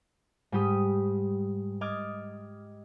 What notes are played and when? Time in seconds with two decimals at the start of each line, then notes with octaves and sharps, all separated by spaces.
0.52 G#2 G3 G4 D#6
1.81 D#5 D6 F6 G#6 A6